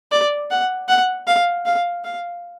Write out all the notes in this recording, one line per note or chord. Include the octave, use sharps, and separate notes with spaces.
D5
F#5
F#5
F5
F5
F5